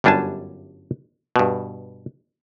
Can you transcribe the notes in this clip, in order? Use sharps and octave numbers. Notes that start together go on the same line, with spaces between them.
G1 F#2 G3 D4 G#5 A5
G2 B2